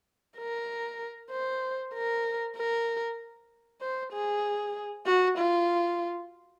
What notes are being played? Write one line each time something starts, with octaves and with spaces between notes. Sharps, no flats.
A#4
C5
A#4
A#4
C5
G#4
F#4
F4